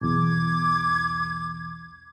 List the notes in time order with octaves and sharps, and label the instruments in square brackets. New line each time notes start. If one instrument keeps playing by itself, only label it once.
[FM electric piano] B1 E2 [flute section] D6 G#6